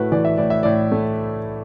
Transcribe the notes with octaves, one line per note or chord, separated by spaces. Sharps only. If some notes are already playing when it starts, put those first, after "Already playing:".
Already playing: A2 A3 E4 F#4 B4
E3 D5
E5
A2 D5
E5
A2 D5
A3